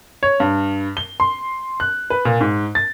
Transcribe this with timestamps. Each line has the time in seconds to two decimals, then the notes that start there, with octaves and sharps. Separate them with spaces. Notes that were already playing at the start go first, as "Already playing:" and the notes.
0.23 C#5
0.40 G2
0.97 G7
1.20 C6
1.80 F#6
2.10 B4
2.25 A#2
2.40 G#2
2.75 A6